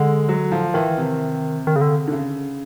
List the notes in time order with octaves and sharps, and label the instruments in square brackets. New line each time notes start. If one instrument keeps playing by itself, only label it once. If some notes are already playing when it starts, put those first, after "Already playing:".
Already playing: [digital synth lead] D3 [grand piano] G#3
[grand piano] F#3
F3
[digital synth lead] D#3 [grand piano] E3
[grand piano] C3
[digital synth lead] D#3
C#3
D3
[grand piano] D3
C#3